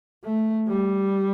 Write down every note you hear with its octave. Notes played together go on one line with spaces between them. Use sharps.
A3
G3